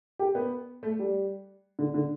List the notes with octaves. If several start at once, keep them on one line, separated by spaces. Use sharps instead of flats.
G4
B3
A3
G3
D3
D3